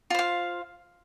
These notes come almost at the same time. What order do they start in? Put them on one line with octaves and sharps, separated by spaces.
F4 C5 F5